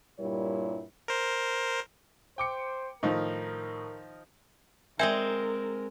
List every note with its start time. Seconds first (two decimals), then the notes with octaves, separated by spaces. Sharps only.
0.20 G2 A#2 G3 E4 A#4 C#5
1.08 A#4 C5
2.38 C5 G5 D6 C#7
3.03 A2 D#3 F3 D#4 A#4
4.99 G#3 C4 A#4 C5 E5 G#5 G#6